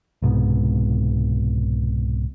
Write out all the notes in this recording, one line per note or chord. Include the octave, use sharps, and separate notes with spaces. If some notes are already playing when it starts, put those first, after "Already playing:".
C2 G#2 B2